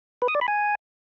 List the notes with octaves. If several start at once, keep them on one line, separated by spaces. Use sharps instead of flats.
B4
D#6
D5
B5
G#5